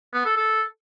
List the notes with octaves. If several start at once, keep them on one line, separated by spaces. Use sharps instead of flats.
B3
A4
A4